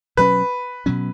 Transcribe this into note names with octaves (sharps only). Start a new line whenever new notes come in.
B2 F#3 C#4 B4
B2 F#3 C#4